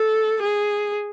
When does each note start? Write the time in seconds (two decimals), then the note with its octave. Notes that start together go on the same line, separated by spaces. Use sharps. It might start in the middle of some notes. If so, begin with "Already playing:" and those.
Already playing: A4
0.42 G#4